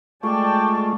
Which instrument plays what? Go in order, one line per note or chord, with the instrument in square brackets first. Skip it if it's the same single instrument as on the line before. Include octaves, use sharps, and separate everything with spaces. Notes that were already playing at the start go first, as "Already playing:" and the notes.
[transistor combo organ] G#3 A3 F4 [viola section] D5 G5 A5 [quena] C#6